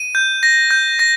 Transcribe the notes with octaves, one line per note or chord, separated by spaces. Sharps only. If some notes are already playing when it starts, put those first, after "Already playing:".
Already playing: D#7
G6
A#6
G6
A#6